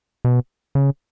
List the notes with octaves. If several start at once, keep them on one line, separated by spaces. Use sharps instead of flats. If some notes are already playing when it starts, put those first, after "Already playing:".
B2
C#3